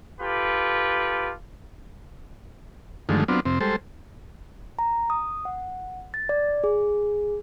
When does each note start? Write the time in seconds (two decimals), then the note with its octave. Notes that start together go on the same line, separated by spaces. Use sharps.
0.21 F4 G4 A4 B4
3.09 G2 D3 D#3 F3 G#3 A3
3.28 F#3 B3 C4 D4 F4
3.45 F2 C3 C4
3.61 G3 G#3 A4 C5
4.79 A#5
5.10 D#6
5.45 F#5
6.14 A6
6.29 D5
6.64 G#4